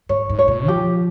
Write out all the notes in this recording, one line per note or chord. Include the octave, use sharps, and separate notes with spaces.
G#2 C#5
G#2
C#5
A#2
F3 G4